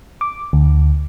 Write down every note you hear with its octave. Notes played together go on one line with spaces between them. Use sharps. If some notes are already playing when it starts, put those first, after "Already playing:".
D6
D2